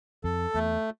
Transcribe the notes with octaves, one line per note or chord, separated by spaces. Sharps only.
F2 A4
E2 A3